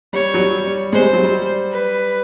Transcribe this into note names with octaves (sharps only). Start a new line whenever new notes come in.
G3 C#5
F#3
G3
G3
G#3 C5
G3
F#3
G3
B4